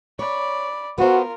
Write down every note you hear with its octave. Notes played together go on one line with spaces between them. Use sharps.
C#5 D5 B5
B3 F4 F#4 A#4 C5